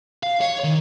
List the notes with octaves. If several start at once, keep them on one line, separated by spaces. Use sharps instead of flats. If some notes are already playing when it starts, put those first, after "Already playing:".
F5
C#5
D#3